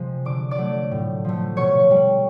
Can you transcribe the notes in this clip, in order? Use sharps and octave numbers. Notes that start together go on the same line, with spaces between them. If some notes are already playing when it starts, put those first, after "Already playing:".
Already playing: C3 F3 G#3
D3 D6
D5 D6
F#3 A3
A2
F3 A3
B2 C#5 C#6
G3